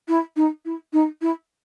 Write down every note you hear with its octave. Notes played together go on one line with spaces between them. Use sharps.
E4
D#4
E4
D#4
E4